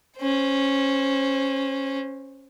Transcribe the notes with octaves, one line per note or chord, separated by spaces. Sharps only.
C#4 C5